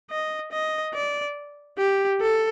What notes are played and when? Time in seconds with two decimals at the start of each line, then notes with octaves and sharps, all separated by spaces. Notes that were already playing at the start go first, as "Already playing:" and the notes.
0.10 D#5
0.52 D#5
0.94 D5
1.78 G4
2.21 A4